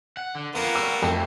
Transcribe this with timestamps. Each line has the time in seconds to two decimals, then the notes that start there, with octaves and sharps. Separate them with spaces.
0.17 F#5
0.35 D3
0.55 F2 A#3 B3 F4
0.75 G3 F#4 E6
1.02 F2 F#3 A3 C4